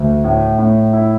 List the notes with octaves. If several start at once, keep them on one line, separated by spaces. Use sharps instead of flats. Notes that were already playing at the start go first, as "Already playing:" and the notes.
Already playing: D2
A2
A2
E4